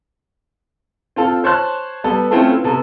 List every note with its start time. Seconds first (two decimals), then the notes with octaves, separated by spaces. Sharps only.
1.16 C4 F4 A4
1.44 C5 C#5 A5 C6 F#6
2.04 G3 B3 A4
2.31 A3 C4 C#4 E4 F4 A4
2.49 B4
2.64 C3 B3 A4